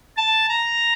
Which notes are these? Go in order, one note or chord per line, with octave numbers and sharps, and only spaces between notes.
A5
A#5